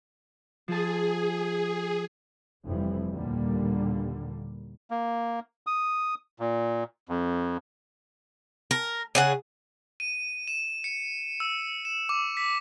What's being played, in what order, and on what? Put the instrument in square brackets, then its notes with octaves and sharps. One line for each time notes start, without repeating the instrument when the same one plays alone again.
[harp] F3 A5 [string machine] G#4
[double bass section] F1 F2 E3 G3
D#2 A#2 D3 G3 A#3
[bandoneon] A#3
D#6
A#2
F2
[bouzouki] A#4
C#3 G#4 F#5
[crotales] D#7
E7
C#7
E6
E7
D6
B6